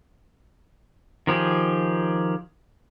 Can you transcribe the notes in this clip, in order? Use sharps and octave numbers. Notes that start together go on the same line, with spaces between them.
D#3 F3 G4 G#4